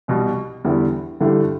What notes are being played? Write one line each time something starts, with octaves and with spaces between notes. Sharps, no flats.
C2 B2 G3
E2 D3 G3 B3 E4
G2 D3 A3 E4 G4